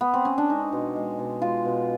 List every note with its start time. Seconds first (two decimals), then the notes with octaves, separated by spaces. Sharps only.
0.01 B3
0.14 C4
0.25 C#4
0.38 D4
0.49 G#3 D#4
0.72 B2
0.96 G#3
1.19 B2
1.42 G#3 F4
1.65 B2